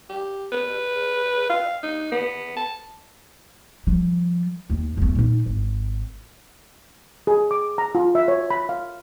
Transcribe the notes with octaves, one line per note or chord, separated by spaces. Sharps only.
G4
B4
F5
D#4
B3
A5
F3 G3
D#2
E2 A3
A#2 D#4
G#1
G#4
D6
A#5
F4
E5
C#5
B5
F5